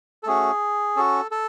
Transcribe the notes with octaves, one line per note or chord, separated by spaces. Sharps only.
A4
A3 C#4 F#4 G#4
C#4 F#4 A4
A4